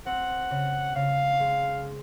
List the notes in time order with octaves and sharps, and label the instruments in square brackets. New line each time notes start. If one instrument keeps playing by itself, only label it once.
[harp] C4 [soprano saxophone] F#5
[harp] C#3
[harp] C#3 [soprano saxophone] F5
[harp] G#3